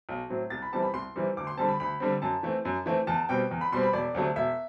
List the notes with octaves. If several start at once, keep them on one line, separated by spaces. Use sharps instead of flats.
B1
A2 F#3 C4
C2 A6
B5
C3 E3 G3 C4 A5
B5
C2 C6
C3 E3 G3 C4
D2 D6
C6
D3 G3 C4 A5
B5
D2 B5
D3 G3 C4
F#2 A5
E3 A3 C4
F#2
E3 A3 C4
E2 A5
B2 G3 C4 G5
E2
B5
B2 G3 C4 C6
B5
E1 D5
D2 C3 F#3 A3
E1 E5